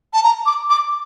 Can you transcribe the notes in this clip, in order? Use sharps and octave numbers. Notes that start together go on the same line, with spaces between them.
A5
A#5
D6
D6